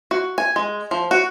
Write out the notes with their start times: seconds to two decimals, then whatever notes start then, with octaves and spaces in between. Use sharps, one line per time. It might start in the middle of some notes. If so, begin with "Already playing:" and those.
0.11 F#4
0.38 G#5
0.56 G#3
0.91 F3
1.11 F#4